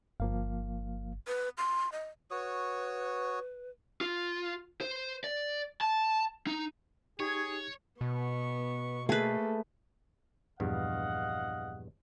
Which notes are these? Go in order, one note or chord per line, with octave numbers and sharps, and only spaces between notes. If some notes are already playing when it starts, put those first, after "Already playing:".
G1 F3 A#3 F5
B4
C6
D#5
F#4 B4 C#5 D#6
F4
C5
D5
A5
D#4
D#4 G4 G#4 C#5 C#6 G#6
B2 B3 C#6
A3 A#3 G#4 A4 B4
A#1 E2 G2 D#5 F5 F#5